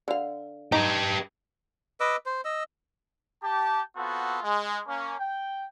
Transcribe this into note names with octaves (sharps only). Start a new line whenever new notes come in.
D3 F5
D#4 G4 B4
B4 D#5 D6 E6
C5
D#5 E6
G4 A5
B3 C4 F4 F#4 A4
G#3
A#3 C#4
G5